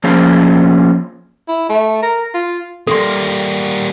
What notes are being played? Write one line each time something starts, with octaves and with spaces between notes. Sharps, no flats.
F3 A#3 C#4 F4 G#4 C5
E4
A3
A#4
F4
G3 A#3 A4 C6